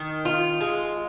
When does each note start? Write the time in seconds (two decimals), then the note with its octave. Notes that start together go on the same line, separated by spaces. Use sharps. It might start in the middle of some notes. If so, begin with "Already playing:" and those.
Already playing: D#3
0.25 F4
0.61 G#3